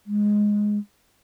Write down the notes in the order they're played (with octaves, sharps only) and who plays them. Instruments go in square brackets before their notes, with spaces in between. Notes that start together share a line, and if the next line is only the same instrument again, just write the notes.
[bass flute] G#3